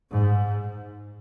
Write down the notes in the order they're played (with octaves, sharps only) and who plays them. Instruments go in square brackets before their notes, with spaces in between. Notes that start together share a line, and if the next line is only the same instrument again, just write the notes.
[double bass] G#2